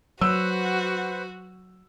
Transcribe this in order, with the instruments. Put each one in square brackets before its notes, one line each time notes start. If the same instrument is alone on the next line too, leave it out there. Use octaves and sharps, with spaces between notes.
[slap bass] F#3 [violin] F#4 [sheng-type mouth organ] B4 C5 F#5 [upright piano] E6